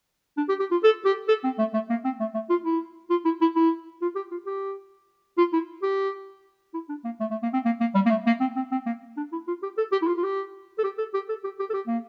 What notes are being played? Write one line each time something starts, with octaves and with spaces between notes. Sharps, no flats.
D4
G4
G4
F4
A4
G4
A4
C4
A3
A3
A#3
C4
A3
A3
F4
E4
F4
E4
E4
E4
F4
G4
F4
G4
F4
E4
G4
E4
D4
A#3
A3
A3
A#3
C4
A#3
A#3
G3
A#3
A3
A#3
C4
C4
C4
A#3
D4
E4
F4
G4
A4
G4
E4
F4
F4
G4
A4
G4
A4
G4
A4
G4
G4
A4
G4
A#3